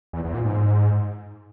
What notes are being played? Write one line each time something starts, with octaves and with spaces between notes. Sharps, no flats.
E2
E2
A#2
G#2